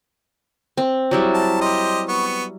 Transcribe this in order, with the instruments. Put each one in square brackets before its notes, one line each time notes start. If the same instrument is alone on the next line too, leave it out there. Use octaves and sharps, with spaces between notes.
[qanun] C4
F#3 G3 E4
[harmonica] A5
G4 C5 D#5
B3 C#6